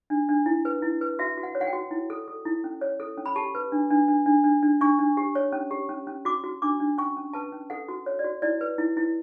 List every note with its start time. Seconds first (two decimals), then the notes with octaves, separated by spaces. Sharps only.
0.10 D4
0.29 D4
0.46 E4
0.65 B4
0.82 E4
1.01 B4
1.19 F#4 E5
1.37 F#4
1.43 F#5
1.55 C#5
1.61 F#5
1.67 G5
1.73 F#4
1.91 E4
2.10 A4
2.28 A4
2.45 E4
2.64 C#4
2.81 C#5
3.00 A4
3.18 C#4
3.26 B5
3.36 G4 A5
3.55 B4
3.72 D4
3.91 D4
4.08 D4
4.26 D4
4.44 D4
4.63 D4
4.81 D4 C#6
4.99 D4
5.17 G4
5.35 C#5
5.53 C#4
5.71 G4
5.89 C#4
6.07 C#4
6.25 F#4 D6
6.44 F#4
6.62 D4 D6
6.80 D4
6.98 C#4 C#6
7.16 C#4
7.33 B4 A5
7.52 C#4
7.70 A4 F#5
7.88 F#4
8.06 C#5
8.19 D5
8.24 F#4
8.42 E4 D5
8.61 B4
8.78 E4
8.97 E4